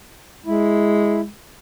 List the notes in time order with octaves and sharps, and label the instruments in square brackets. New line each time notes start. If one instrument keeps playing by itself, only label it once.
[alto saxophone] G#3 [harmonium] E4